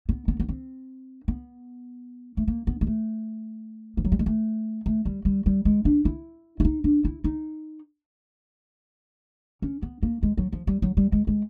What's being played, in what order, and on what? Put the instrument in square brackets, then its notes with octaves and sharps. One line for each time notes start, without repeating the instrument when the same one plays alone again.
[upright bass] B3
B3
B3
C4
B3
A3
A#3
B3
G#3
A3
F3
F#3
G3
G#3
A3
A3
G3
G3
G3
G#3
D4
E4
E4
D#4
D4
E4
D#4
C#4
B3
A#3
G#3
F#3
F3
G3
F#3
G3
G#3
G#3